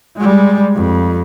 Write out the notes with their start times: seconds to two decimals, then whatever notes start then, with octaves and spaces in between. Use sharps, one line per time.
0.17 G3 G#3
0.75 F2